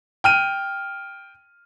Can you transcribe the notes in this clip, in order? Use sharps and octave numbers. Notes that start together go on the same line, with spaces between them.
G5 F6 D#7